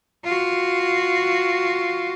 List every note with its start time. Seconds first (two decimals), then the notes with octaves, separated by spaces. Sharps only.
0.24 F4 F#4